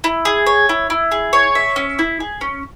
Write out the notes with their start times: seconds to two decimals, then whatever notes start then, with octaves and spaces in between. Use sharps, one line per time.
0.04 E4
0.25 G#4
0.46 C#5
0.69 E4
0.90 E4
1.12 G#4
1.33 C#5
1.55 E5
1.76 C#4
1.99 E4
2.20 G#4
2.41 C#4